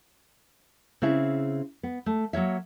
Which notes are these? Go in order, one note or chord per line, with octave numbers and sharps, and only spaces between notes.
C#3 C4 E4 G#4 E5
B3
A3
F#3 A#3 C#5 E5